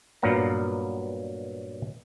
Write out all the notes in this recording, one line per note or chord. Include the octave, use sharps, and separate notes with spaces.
G2 A#2 F#3 B3 F5 A#5